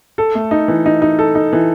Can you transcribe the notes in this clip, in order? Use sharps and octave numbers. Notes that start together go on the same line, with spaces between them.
A4
A3
D#4
E3
D#4
D#4
A4
D#4
E3